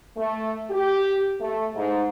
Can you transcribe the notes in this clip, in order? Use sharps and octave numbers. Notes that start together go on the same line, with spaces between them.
A3
G4
A3
G#2